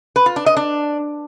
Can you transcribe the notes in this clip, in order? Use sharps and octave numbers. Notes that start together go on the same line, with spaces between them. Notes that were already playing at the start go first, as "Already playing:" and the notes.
B4
F4
D4
D#5
D4